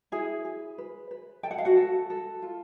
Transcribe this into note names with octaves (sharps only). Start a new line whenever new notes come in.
E4 G#4 G#5
G#4
B4
B4
A4 G5
F#5
F5
F#4 F#5
A4
A4
F4